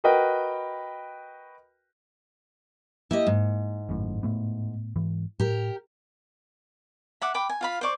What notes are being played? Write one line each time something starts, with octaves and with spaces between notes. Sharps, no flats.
F#4 A#4 B4 D#5 G5
A#3 E4 G4 D#5
G#2
G#1 F#2 A2
A2 A3 B3
G#2 E3
A2 G4 A#4
E5 F#5 D6
G5 B5 D6
G#5
F4 F5 B5
C5 D5 C#6